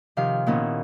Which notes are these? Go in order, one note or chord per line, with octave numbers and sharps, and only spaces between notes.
C3 D#3 F3 F5
A#2 D#3 B3 C#4 E4